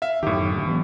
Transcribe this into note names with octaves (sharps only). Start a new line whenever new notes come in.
E5 F5
F#2 A2 D#3 G4
D2
E3 F#3 B3